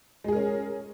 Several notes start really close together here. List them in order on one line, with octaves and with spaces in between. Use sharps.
G#3 G#4 A#4 C#4